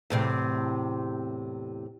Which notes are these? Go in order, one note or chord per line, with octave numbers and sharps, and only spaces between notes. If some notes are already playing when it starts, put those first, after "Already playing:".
E2 A2 C3